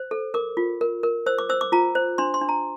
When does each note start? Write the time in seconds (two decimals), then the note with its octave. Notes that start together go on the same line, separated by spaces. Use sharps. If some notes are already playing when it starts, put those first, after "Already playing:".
Already playing: C5
0.11 A4
0.34 A#4 D6
0.57 F4
0.81 A#4
1.03 A#4
1.26 C5 E6
1.38 D6
1.49 C5 E6
1.61 D6
1.72 F4 A#5
1.95 C5
2.18 D4 C6
2.34 C6
2.41 D4
2.49 A#5